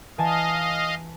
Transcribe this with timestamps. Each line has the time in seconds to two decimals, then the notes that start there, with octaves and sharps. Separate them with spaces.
0.18 E3 D#5 F5 G#5 A5